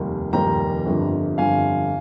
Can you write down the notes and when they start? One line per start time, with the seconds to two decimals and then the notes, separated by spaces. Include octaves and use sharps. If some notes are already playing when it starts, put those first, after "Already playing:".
Already playing: F1 D#2 D#3 G3
0.33 F1 D#2 D#3 G3 G5 A#5
0.86 G1 F2 D3 G3
1.38 G1 F2 D3 G3 F5 G#5